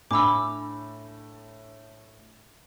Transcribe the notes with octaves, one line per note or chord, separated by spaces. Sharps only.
A2 D4 B5 D6 E6